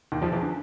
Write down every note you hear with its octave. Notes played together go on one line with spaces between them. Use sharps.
D#2 D#3
F2 F3
E2 E3
D3